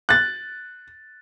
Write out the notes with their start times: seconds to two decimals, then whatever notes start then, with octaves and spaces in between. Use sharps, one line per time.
0.09 F#6 A6